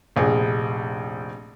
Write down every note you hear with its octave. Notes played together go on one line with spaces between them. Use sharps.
F1 A#1 G#4